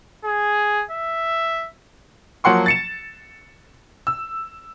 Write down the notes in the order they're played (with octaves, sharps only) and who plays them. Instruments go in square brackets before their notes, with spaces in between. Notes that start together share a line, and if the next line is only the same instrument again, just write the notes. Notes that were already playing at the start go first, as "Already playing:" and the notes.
[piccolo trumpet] G#4
E5
[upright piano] F3 F#3 A#3 F#5 C6 C#6
A6 C#7 E7
E6